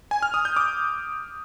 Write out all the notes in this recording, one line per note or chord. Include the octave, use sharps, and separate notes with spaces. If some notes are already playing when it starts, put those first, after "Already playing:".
G#5
F6
D#6
G6
D6